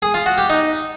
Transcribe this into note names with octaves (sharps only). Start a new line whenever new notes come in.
G#4
F4
F#4
G4
D#4